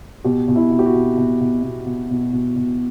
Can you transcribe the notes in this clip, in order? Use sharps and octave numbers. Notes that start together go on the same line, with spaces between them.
B2 G4
B2
E4
B2
G4
F#4
B2
B2
B2
B2
B2
B2
B2
B2